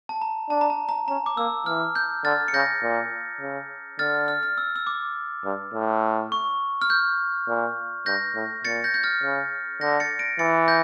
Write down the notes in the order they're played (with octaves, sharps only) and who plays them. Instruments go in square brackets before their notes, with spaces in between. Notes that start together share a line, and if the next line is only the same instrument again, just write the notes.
[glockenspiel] A5
A#5
[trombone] D4 [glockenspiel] A5
[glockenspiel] A#5
A5
A#5
[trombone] C#4 [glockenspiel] A#5
[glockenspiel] D6
[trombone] A#3 [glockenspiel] E6
[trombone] E3 [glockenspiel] F6
[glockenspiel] G6
[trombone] D3 [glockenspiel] F6 A6
[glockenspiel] C#7
[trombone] C#3 [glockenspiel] G6 A#6
[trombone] A#2
C#3
[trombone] D3 [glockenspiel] F6 A6
[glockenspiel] F6
F6
E6
E6
D6
[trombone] G2
A2
[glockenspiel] C#6
F6
G6
[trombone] A#2
[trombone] G2 [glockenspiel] G6 A#6
[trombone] A2
[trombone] A#2 [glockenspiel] A6 C#7
[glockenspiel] G6 A#6
G6
F6 A6
[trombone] C#3
[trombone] D3 [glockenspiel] G6 A#6
[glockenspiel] A6 C#7
A#6 D7
[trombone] E3 [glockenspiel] A6 C#7
[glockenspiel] G6 A#6